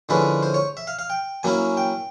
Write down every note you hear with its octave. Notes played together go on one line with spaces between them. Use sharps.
D3 F3 G#3 C#4 E4 B4
C5
C#5
E5
F5
F5
G5
F#3 A#3 C#4 E4 G#5
G5